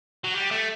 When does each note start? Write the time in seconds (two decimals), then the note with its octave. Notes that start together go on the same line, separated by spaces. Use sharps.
0.24 F#3
0.34 G3
0.51 A3